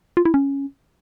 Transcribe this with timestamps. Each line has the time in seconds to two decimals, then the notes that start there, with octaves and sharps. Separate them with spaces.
0.17 F4
0.25 E4
0.34 C#4